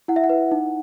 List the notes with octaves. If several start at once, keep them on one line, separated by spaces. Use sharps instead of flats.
E4 F#5
E5
F#5
B4
D#4